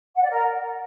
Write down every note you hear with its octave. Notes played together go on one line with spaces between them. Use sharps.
F#5
D5
A#4